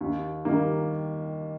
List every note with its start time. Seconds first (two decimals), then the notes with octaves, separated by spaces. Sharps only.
0.01 D#2
0.45 D#3 G3 A#3